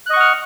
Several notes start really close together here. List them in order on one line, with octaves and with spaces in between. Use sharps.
F#6 D#5 C#6 F#5 F6